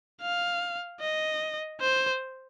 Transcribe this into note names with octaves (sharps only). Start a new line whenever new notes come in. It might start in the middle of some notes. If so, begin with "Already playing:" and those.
F5
D#5
C5